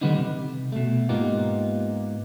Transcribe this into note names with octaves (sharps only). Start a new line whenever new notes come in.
D3 D#3 G3 B3 D4 D#4
C3
B2 A3
G#2 A#3 B3 D#4 F4 G4